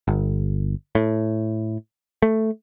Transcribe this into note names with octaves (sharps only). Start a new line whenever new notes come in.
G1
A2
A3